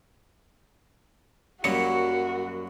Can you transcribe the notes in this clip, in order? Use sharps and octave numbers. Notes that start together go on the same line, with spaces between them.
F#2 F#3 G3 A#3 F#4 C#7